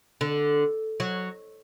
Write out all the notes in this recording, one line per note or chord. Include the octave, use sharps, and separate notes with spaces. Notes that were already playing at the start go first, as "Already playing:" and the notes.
D3
F#3